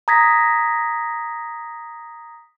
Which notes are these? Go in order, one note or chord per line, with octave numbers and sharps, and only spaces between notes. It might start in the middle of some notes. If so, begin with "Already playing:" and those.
A#5 D#6 G#6 A#6 B6